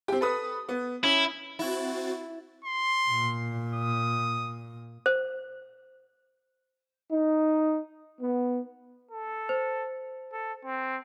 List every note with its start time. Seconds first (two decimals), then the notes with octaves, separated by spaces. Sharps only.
0.08 C4 G4
0.21 A4 B4 D#6
0.69 B3
1.03 C#4 E4
1.59 C4 E4 F#4 A6
2.65 C6
3.10 A#2
3.75 D#6
5.06 C5
7.12 D#4
8.21 B3
9.11 A4
9.49 C5
10.33 A4
10.65 C4